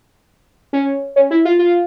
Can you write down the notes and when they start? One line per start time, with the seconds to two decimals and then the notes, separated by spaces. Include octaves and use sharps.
0.73 C#4
1.16 C#4
1.31 E4
1.45 F4
1.59 F4